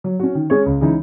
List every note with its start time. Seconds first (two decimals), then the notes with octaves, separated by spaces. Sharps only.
0.04 F#3
0.19 C#4 F#4
0.35 D#3
0.50 G#3 C#4 G#4 C#5
0.66 C#2
0.81 C#3 E3 G#3 D#4